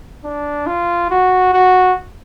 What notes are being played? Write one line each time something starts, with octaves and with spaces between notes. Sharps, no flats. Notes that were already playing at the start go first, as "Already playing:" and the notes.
D4
F4
F#4
F#4